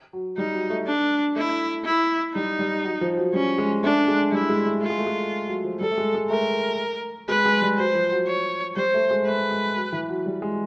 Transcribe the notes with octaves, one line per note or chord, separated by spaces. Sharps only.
F#3
G3 D#4
F#3
A3
D4
A3 E4
E4
G3 D#4
G3
F#3
F3
F#3
G3 C#4
G#3
A3 D4
G#3
G3 E4
G#3
A3
A3 F4
G#3
A3
G#3
F#3
F3
G3 A4
A3
G#3
G#3
A3 A#4
G#3 B4
G#3
G3
F#3 C5
F3
F#3
C#5
G3 C5
A3
G#3
A3 B4
G#3
F#3
E3
F#3
G3
G#3